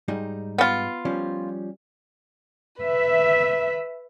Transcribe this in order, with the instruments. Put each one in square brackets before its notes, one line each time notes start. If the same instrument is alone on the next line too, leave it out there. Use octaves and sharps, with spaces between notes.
[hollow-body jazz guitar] G#2 G3 D#4
[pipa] B3 F4
[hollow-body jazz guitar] F3 G3 C#4
[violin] B4 [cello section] E5